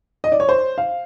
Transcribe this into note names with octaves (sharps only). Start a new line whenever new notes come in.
D#5
D5
C#5
C5
F5